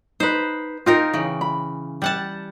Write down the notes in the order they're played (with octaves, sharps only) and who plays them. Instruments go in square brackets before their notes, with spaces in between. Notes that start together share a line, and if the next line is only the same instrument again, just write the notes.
[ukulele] D#4 B4 [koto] C5
[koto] C4 D#4 A#4 [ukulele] F4
[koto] C#3 E3
[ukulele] B5
[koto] G3 F#5 A5